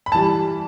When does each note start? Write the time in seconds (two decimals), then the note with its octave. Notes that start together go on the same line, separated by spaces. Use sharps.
0.06 B5
0.12 A5
0.14 E3 G3